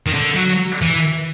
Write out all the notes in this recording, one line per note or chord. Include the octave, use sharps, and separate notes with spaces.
D#3
D3
F#3
E3